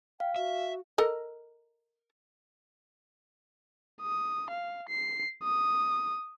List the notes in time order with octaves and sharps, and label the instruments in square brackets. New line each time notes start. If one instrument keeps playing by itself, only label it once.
[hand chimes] F5 [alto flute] G5
[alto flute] F#4 [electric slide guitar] E5
[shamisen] A4 A#4 D#5
[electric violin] D#6
F5
C7
D#6